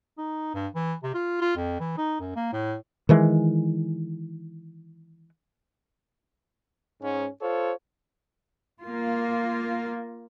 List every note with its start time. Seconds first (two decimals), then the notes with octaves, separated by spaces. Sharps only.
0.18 D#4
0.54 G2
0.75 E3
1.03 C3
1.14 F4
1.41 F4
1.56 F2
1.80 E3
1.97 D#4
2.20 F#2
2.36 A#3
2.53 A2
3.09 D#3 E3 G#3
7.02 G#2 C#4
7.42 F4 A4 C5 C#5
8.82 A#3 F4